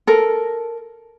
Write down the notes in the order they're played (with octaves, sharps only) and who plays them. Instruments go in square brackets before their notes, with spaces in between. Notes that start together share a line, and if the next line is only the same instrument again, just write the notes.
[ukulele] A4 A#4